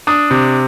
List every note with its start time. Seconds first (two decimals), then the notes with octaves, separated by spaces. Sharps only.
0.07 D4 D#6
0.31 C3